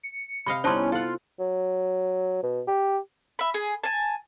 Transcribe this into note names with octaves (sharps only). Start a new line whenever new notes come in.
C#7
C3 D#5 F5 B5
G3 B3 C#4 D#4 E4 C5 A5 C6
F4 A4 F#5
F#3
B2
G4
E5 B5
G#4
G#5 A5